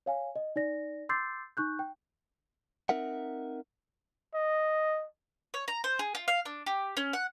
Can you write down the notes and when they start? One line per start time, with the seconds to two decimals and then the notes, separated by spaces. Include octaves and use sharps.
0.06 C#5 F5 G#5
0.36 D#5
0.56 D#4 D5 A#6
1.09 C6 D6 E6 G6 A6 C7
1.57 D#4 C#6 F#6 G6
1.79 G5
2.89 C4 D#4 A#4 E5 F#5
4.34 D#5
5.54 C#5
5.68 A#5
5.84 C5
5.99 G#4
6.15 F4
6.28 F5
6.45 D4
6.66 G4
6.97 C#4
7.13 F#5